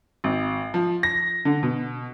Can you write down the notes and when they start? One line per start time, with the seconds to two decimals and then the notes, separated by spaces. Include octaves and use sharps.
0.24 G#1
0.74 F3
1.03 A#6
1.45 D3
1.63 B2